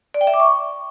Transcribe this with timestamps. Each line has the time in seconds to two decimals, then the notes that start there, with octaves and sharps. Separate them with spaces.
0.14 D5
0.21 G5
0.27 E5
0.34 D6
0.40 C#6